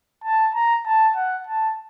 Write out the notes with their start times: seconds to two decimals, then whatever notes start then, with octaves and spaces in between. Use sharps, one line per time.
0.24 A5
0.55 A#5
0.86 A5
1.16 F#5
1.47 A5